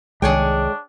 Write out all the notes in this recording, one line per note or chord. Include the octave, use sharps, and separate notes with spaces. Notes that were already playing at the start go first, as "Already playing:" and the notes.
C2 D#3 G#3 D4 G#4 C#5 G5